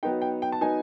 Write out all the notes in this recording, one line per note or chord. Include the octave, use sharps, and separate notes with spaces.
F#3 B3 D#4 G5
G5
G5
A5
F#3 B3 D#4 G#5